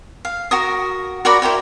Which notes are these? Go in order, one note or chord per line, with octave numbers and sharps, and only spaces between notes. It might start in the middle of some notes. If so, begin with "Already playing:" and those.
F5
F#4 A#4 D#6
F#4 A#4 D5 B5
E4 A#4 C5 G5